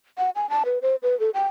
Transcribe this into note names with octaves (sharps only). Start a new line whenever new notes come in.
F#5
G#5
A5
B4
C5
B4
A4
G5